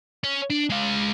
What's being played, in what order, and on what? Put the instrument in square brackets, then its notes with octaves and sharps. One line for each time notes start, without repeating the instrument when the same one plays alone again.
[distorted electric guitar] C#4
D4
G#3 F5